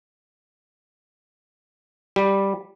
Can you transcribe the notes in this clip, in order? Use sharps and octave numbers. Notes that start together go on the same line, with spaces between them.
G3